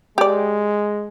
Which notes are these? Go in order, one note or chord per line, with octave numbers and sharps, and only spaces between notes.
G#3 G4 D5